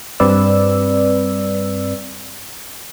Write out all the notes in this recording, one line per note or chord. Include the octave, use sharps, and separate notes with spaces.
G2 G3 C4 B4 D5 E6